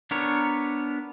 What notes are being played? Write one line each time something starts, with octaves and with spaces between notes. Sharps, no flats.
B3 D4 A#4 C#5